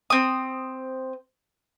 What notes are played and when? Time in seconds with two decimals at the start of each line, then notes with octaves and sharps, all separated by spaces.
0.10 C4 D#6